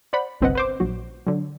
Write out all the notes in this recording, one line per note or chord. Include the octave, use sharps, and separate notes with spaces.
C5 D5 F#5 B5
G1 C2 C4 B4 D#5 F#5
B4 C5 D6
A#1 F#3 F#4
D3 F#3